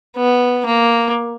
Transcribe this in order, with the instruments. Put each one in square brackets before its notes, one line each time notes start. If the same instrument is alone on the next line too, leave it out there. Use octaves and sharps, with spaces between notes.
[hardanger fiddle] B3
A#3